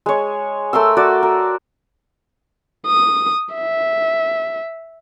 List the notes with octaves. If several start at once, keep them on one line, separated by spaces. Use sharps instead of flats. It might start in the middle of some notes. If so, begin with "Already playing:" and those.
G#3 C#5
A3 A#4 C6 E6
F#4 D5
A#4
D#6
E5